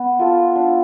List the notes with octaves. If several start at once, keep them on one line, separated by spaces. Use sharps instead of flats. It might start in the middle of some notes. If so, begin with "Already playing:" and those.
Already playing: B3
F4 A4
D4